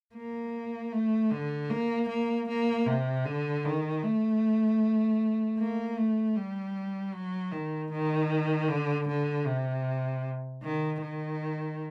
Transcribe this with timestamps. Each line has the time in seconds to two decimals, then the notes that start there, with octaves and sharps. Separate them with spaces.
0.15 A#3
0.93 A3
1.31 D3
1.70 A#3
2.08 A#3
2.48 A#3
2.87 C3
3.26 D3
3.64 D#3
4.03 A3
5.58 A#3
5.98 A3
6.36 G3
7.14 F#3
7.52 D#3
7.91 D#3
8.68 D3
9.08 D3
9.47 C3
10.63 D#3
11.02 D#3